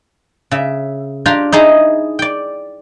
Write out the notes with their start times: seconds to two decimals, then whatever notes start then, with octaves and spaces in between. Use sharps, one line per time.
0.51 C#3 E5
1.26 D4 F4 G4 G5 A#5
1.52 D#4 E4 G#4 D#5 A5
2.19 D5 G5